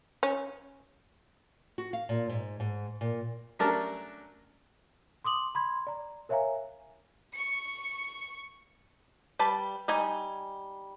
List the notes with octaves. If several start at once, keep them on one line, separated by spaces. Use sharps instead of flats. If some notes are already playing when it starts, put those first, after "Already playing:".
C#4
F#4
F5
A#2
G#2
G#2
A#2
F#3 A3 C#4 D4 A#4 A5
C6 D6 D#6 F#7
B5 C6 G#6
D5 A#5
A#4 C#5 E5 F5 G#5 A#5
C#6 C#7
G3 B4 A5
G3 D#4 G#5